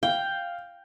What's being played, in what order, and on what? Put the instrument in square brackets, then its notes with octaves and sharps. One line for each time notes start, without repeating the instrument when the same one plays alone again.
[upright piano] F5 [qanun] G5